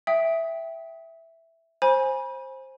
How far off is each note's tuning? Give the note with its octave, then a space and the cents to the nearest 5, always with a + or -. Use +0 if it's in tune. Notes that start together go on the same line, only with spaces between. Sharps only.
E5 +0 G5 +0 D#6 +15
C5 +15 G#5 -5 B5 -35